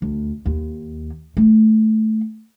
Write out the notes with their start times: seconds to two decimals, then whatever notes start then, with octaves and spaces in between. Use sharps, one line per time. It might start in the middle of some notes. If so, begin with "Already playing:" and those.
0.02 D2
0.46 D#2
1.37 A3